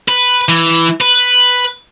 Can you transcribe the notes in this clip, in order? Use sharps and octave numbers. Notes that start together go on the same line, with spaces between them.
B4
E3
B4